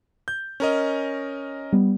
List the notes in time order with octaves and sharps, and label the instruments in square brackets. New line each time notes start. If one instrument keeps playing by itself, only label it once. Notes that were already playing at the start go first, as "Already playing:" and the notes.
[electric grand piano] G6
C#4 A#4 D#5
[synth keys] G3 B3